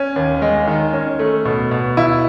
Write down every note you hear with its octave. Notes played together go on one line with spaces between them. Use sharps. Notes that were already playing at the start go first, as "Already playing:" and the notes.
Already playing: C#4
D#2
G#3
D#3
C#4
A3
B2
B2
E4